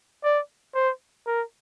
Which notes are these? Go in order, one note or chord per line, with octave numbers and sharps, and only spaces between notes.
D5
C5
A#4